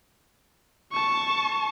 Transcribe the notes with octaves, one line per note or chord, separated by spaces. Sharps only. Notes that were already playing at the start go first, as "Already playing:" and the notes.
A5 C#6